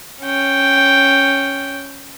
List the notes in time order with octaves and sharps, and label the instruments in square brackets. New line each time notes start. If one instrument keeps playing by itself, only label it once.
[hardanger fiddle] C#4 G5